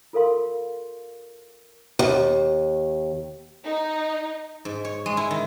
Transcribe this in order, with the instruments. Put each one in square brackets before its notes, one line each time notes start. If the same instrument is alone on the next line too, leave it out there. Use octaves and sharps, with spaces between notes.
[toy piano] F4 A4 A#4 F5 C6
[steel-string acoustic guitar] D#2
[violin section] D#4
[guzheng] G#2
C#5
G#3
E4
D#3